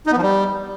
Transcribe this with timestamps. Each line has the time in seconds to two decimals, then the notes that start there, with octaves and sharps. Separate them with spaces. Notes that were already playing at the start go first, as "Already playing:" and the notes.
0.06 D#4
0.12 B3
0.17 F3
0.22 G3